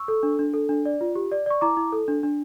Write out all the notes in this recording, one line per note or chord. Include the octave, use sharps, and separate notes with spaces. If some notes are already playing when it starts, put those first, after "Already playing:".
Already playing: C#6 E6
A4
D4
D4
A4
D4
D5
F4
G4
D5
D5 C#6
E4 A#5 D6
E4
A4
D4
D4